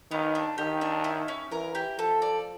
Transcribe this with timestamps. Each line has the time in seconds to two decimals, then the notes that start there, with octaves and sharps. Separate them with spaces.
0.11 D#3 B3
0.35 D4
0.58 D#3 G4
0.81 D4
1.04 E4
1.28 C#4
1.51 E3 A#4
1.75 G4
1.98 F3 A4
2.22 D5